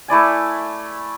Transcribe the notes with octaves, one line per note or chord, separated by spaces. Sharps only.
A3 E4 D5 G#5